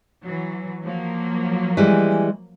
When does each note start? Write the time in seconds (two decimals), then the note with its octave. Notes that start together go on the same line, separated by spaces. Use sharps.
0.23 E3 F#3
0.84 F3 F#3 A#3
1.77 E3 G3 G#3